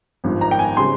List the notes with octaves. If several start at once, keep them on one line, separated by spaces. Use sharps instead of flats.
G#1 G2 F3
A#5
G5
G#5
C#3 G3 C4 C6